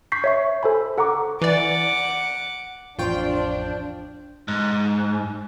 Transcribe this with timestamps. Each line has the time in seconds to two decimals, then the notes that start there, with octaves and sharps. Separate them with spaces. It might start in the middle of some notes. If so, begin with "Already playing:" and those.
0.12 C#6 G6 B6 C7
0.24 C#5 E5 C#6
0.63 A4 C5 G#5 B5
0.97 A4 F#5 A#5 C#6 D6
1.42 E3 D5 F#5 D6
2.99 A1 F2 F3 D4 F4 C5 G5 C#6
4.48 G#2